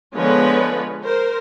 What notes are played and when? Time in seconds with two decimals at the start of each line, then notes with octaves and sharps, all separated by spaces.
0.15 D3 F3 G#3 B3 B4 C#5
1.04 A#4 C5